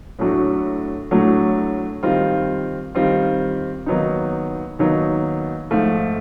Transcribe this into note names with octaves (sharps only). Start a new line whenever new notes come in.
A2 F#3 A3 D4 F#4
A2 F#3 A3 D4 F#4
D#3 G3 C4 F4
D#3 G3 C4 F4
D#2 D#3 F#3 B3 D#4
D#2 D#3 F#3 B3 D#4
G#2 F3 A3